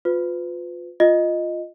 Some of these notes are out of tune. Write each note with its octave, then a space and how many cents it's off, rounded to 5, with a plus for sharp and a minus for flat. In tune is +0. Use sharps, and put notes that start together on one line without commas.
F4 +25 B4 +30
F4 +0 D#5 +0